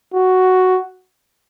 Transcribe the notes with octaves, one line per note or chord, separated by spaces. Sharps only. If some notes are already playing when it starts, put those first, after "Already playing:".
F#4